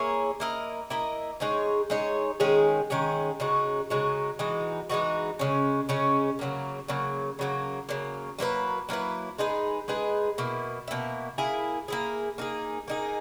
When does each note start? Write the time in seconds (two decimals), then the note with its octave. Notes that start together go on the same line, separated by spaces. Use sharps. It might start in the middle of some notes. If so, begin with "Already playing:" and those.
Already playing: A#3 E4 G#4 C#5
0.40 A#3 E4 A#4 D#5
0.90 A#3 E4 A#4 D#5
1.40 G#3 D#4 G#4 C#5
1.90 G#3 D#4 G#4 C#5
2.40 D#3 G#3 C#4 G#4
2.90 D#3 G#3 C#4 G#4
3.40 C#3 G#3 D#4 F#4
3.90 C#3 G#3 D#4 F#4
4.39 E3 G#3 D#4 F#4
4.89 E3 G#3 D#4 F#4
5.39 C#3 G#3 C#4
5.89 C#3 G#3 C#4
6.39 C#3 F#3 A#3
6.88 C#3 F#3 A#3
7.39 C#3 F#3 A#3
7.89 C#3 F#3 A#3
8.39 F#3 A#3 E4 B4
8.89 F#3 A#3 E4 B4
9.38 G#3 D#4 G#4 B4
9.88 G#3 D#4 G#4 B4
10.38 B2 A#3 E4
10.88 B2 A#3 E4
11.38 A#3 E4 G#4
11.88 A#3 E4 G#4
12.38 A#3 D#4 G#4
12.88 A#3 D#4 G#4